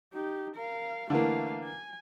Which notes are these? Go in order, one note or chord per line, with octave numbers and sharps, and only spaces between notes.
D#4 G4
A#4 F5
D3 E3 A3 A#3 F5
G#5